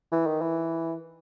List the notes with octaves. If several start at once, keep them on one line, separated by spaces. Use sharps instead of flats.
E3
D#3
E3